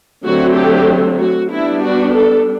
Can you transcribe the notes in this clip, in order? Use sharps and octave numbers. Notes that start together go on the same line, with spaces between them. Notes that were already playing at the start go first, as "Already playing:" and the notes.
D3 F#3 A3 C4 F#4
G4
F#4
G3 B3 D4 E4
F#4
A4